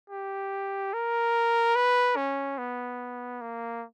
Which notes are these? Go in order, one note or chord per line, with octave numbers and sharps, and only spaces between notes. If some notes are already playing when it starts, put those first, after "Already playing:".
G4
A#4
B4
C#4
B3
A#3